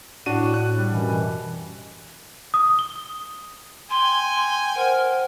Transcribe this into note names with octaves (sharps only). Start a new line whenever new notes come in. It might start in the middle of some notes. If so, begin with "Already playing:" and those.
A2 D4 F#4 D#7
F#6
G3
F#2 B2 E3
D#6
G7
G5 G#5 C6
C6
A#4 C5 F#5